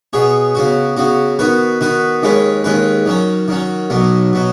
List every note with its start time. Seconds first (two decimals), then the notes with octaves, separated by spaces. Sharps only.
0.13 B2 B3 G#4 C#5
0.55 C#3 B3 F#4
0.97 C#3 B3 F#4
1.39 D#3 B3 F#4 B4
1.81 D#3 B3 F#4 B4
2.22 D#2 D#3 G#3 C#4 B4
2.64 D#2 D#3 G#3 C#4 B4
3.06 D#3 F#3 C#4
3.48 D#3 F#3 C#4
3.90 B1 B2 F#3 B3
4.33 B2 F#3 B3